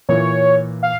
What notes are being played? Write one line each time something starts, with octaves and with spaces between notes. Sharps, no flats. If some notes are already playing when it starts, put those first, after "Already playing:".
A#2 E3 C#5
F5